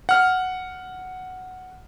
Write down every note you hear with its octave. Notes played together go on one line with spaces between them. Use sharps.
F#5 F6